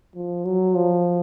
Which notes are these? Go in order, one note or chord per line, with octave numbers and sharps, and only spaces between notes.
F3
F#3
F3